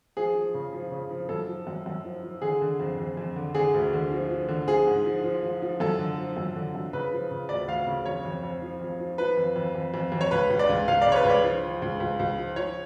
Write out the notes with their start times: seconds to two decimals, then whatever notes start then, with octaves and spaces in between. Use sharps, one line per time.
0.17 F3 G#4
0.35 F3
0.54 C#3
0.73 F3
0.91 C#3
1.11 F3
1.29 F#2 A4
1.48 F3
1.67 F#2
1.86 F#2
2.05 F3
2.23 F3
2.42 D3 G#4
2.61 D3
2.80 F2
2.98 F2
3.17 F2
3.36 D3
3.54 D3 G#4
3.74 D2
3.93 D3
4.11 F3
4.29 F3
4.48 D3
4.67 F3 G#4
4.87 G#2
5.05 F3
5.24 F3
5.42 F3
5.62 F3
5.80 F#2 A4
5.99 D3
6.18 F3
6.37 F#2
6.55 D3
6.75 F#2
6.93 C#3 B4
7.12 F3
7.31 C#3
7.49 D2 D5
7.68 D2 F5
7.87 C#3
8.06 F2 C#5
8.25 F2
8.43 F2
8.62 F3
8.81 F2
8.99 F3
9.18 F3 B4
9.37 F2
9.56 F2
9.75 F2
9.94 F2
10.12 F2
10.21 C#5
10.31 C#2 B4
10.50 C#2
10.59 D5
10.69 C#2
10.88 C#2 F5
11.02 C#3 D5
11.12 C#5
11.16 B4
11.25 C#2
11.30 D5
11.44 F3
11.63 F3
11.82 C#2
12.00 C#2
12.19 C#2
12.38 F3
12.56 F3 C#5